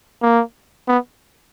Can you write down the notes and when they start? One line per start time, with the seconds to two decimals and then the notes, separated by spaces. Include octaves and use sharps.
0.22 A#3
0.88 B3